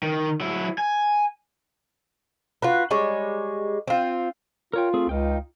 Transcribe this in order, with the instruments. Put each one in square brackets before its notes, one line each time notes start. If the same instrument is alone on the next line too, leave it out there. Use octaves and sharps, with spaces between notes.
[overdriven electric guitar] D#3
F#3 E4
G#5
[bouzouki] F4 F#4 B4
G3 G#3 C#5
C4 F4
[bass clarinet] F4 [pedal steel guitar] A#4 C#5 G5
[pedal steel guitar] A3 C4 G#4
[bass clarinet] C#2 [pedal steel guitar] D#4 F4 G5